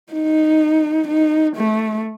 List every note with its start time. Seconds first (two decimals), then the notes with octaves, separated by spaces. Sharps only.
0.13 D#4
1.07 D#4
1.56 A3